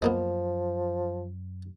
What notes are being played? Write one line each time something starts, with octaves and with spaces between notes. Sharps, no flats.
F#2 F3 G#3 A#3 B3